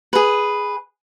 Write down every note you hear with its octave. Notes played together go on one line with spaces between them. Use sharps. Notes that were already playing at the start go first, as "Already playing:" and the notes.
G#4 B4